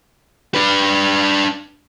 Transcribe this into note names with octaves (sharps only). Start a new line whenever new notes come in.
D4 B4